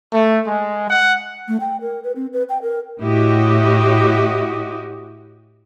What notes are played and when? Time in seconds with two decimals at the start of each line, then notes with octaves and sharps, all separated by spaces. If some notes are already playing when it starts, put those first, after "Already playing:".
0.13 A3
0.47 G#3
0.89 F#5
1.48 A3
1.60 G5
1.81 A#4
2.04 B4
2.16 C4
2.33 B4
2.49 G5
2.62 A#4
3.01 A2 E4 F#4 G4 D#5